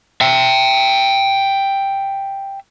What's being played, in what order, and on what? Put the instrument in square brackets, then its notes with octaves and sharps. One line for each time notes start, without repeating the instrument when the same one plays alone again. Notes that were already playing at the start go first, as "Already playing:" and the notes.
[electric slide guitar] E5 G5